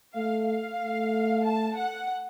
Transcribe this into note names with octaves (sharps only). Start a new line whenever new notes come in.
A3 F5
F5
A3
A5
F#5